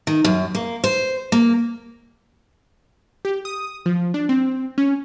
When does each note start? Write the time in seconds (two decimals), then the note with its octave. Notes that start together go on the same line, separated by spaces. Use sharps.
0.07 D#3
0.25 F#2
0.55 A#3
0.84 C5
1.32 A#3
3.25 G4
3.45 D#6
3.86 F3
4.14 D4
4.29 C4
4.78 C#4